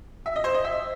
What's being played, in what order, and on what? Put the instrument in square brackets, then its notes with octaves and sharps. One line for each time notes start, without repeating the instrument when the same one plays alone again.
[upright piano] E5
D#5
C5
D#5
E5